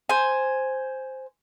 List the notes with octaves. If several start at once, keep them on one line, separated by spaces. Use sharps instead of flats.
C5 G#5